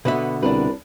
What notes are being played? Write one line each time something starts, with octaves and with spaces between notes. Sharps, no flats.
B2 D3 B3 B4 E5
C2 D4 A#4 B4